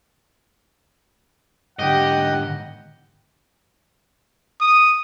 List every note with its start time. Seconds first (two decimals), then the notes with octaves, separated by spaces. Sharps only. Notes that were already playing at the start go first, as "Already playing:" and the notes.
1.79 G#2 D3 G4 D#5 F#5
4.61 D#6